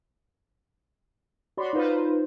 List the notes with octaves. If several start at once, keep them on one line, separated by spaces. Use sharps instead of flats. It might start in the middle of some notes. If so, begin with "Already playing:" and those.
F#4 C#5 D5 B5 C6
D#4 F4 B4 C5